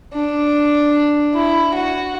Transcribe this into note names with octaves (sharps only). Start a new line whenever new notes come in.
D4
E4
F#4